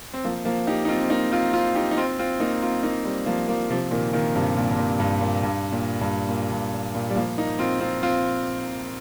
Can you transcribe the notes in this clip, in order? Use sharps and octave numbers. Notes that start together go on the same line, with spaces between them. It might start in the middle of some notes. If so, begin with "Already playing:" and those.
C4
F3 A#3
F3 A#3
D#4 G4
D#4
C4 F4
C4
A#3 D#4
C4 F4
C4 F4
D#4 G4
D#4
C4 F4
C4 F4
A#3 D#4
C4 F4
A#3 D#4
G3 C4
F3 A#3
F3 A#3
C3 F3
A#2 D#3
A#2 D#3
G2 C3
A#2
G2
A#2
G2
A#2
G2
A#2
G2
A#2
G2
A#2
A#2
G3
F3 A#3
A#3 D#4
C4 F4
C4 F4
C4 F4